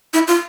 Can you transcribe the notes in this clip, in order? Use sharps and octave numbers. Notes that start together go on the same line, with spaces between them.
E4
F4